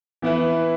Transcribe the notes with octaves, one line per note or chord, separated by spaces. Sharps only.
E3 B3 E4 B4